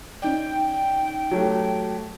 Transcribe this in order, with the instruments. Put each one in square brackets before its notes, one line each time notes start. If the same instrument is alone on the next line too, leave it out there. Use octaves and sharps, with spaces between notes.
[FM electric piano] C#4 D#4 D5 [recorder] G5
[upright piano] F#3 A3 G4